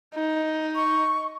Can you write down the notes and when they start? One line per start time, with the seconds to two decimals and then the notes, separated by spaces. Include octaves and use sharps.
0.15 D#4
0.75 C#6